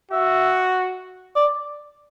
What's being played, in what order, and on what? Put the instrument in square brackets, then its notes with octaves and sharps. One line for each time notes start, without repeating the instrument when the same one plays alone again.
[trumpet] F#4 [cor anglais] E5
[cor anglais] D5